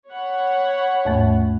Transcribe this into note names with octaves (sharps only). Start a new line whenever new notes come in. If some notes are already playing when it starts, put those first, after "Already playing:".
C#5 F#5 B5
D#2 G#2 A3